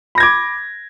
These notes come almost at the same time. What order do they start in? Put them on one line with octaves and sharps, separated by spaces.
B5 A#6 G#6 D6